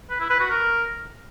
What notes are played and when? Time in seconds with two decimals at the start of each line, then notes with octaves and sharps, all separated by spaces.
0.10 B4
0.20 E4
0.30 B4
0.40 F#4
0.50 A#4